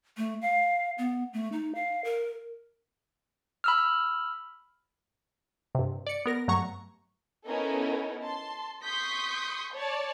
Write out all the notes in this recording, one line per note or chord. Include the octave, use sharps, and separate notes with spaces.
A3
F5
B3
A3
D#4
F5
A#4
B5 E6 F6
G2 C3
D5 C#7
B3 A#4 A#6
G2 F#3 A3 A#5 C#6
B3 C#4 D#4 E4 A4 A#4
A5 C6
C6 C#6 D#6 G6 B6
C#5 D5 A5